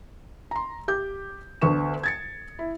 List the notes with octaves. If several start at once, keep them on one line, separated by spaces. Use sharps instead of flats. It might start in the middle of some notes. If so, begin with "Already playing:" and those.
A#5 C6
G4 D6 G6
D2 D3 B3 C#6 E7
G#6 A6 C#7
E4